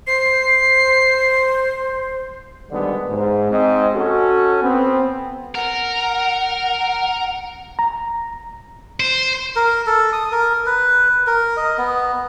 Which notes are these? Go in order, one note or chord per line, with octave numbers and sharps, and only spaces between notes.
C5 C7
G#2 D3 D#3 G3 B3 D4
G#2
G#2 C4 D#5
C#4 F#4 A4
B3 C4
A#4 F#5
A#5
C5
A#4
A4
D#6
A#4
B4
A#4
D#5
B3